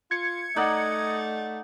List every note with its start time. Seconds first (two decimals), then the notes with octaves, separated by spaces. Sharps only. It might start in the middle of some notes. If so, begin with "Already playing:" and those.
0.11 F4 G#6 C#7
0.56 A3 D#4 D5 D#5 F#5